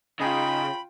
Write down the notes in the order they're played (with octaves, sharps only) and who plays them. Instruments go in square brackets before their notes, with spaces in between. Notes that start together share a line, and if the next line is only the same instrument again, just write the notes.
[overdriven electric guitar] C#3 [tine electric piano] D#4 G#4 D#5 [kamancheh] F4 G5 [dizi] B5